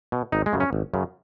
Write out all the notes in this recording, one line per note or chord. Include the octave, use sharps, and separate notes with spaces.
B2
G#1 D#4
G#3
F#2 C#3
C#4
G#1
F#2 C#3